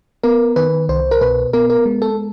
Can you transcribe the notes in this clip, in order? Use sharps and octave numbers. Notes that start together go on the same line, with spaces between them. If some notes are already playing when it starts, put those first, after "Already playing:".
B3 A#4
D#3 B4
C2 C5
A#4
B2 B4
B3 A#4
A#4
G#3
A4